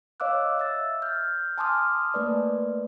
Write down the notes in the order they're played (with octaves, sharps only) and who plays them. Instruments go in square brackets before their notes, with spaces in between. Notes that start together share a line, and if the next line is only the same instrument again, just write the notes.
[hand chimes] C#5 D#5 F5 D6 E6 F#6
E5 E6 A6
F6 G6
G#5 A5 C6 D6 D#6 F6
A3 A#3 B4 D5